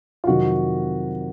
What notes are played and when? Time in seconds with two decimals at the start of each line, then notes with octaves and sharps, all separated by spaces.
0.24 F4
0.27 F2 C3 D#3 F#3 F#4